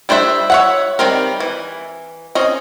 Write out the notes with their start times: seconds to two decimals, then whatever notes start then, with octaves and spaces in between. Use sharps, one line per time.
0.09 G3 D4 C5 C#5 E5
0.50 C#5 E5 F#5
0.99 D#3 G3 C4 A#4
1.40 E3
2.35 C4 C#4 D#5